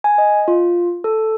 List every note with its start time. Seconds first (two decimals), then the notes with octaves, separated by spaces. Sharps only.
0.04 G#5
0.18 D#5
0.48 F4
1.04 A4